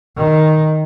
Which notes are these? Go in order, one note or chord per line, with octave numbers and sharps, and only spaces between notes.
D#3